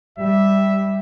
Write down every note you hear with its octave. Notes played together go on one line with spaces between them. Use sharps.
G3 E5